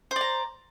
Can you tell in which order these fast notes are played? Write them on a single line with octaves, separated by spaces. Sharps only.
C5 D5 A#5